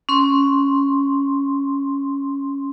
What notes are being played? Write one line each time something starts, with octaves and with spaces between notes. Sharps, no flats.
C#4 C6